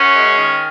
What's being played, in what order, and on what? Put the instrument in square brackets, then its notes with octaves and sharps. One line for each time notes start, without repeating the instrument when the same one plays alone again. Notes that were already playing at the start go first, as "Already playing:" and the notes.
Already playing: [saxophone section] F#2 C#4
G#3
D#3